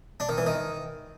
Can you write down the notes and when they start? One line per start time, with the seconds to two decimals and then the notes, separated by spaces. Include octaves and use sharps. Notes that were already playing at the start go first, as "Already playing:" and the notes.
0.20 D4
0.29 D#3
0.38 E3
0.46 D#3